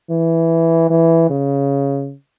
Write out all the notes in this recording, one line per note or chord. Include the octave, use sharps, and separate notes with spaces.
E3
E3
C#3